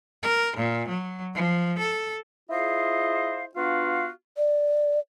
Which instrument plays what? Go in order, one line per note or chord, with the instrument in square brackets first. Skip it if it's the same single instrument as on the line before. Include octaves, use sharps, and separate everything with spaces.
[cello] A#4
A#2
F#3
F3
A4
[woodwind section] E4 F4 G#4 C5 D#5 F5
B3 D4 F4 F#4 F5
[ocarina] D5